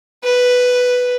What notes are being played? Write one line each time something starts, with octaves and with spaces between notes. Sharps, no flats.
B4